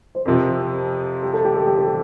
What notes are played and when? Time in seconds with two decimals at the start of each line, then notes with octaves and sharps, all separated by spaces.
0.15 C5
0.25 F2 C3 F3 A#4
1.23 G4
1.33 A4
1.44 G4
1.56 A4
1.66 G4
1.77 A4
1.87 G4